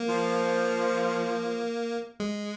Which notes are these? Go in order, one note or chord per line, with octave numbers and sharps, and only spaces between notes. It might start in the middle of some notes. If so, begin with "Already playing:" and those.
Already playing: A#3
F3
G#3